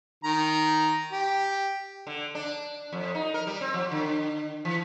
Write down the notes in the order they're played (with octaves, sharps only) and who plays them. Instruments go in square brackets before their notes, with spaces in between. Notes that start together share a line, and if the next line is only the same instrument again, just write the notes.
[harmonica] D#3 A#5
G4
[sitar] D3
D4
F2
D#4
A#4
G3
C4
F3
D3
E3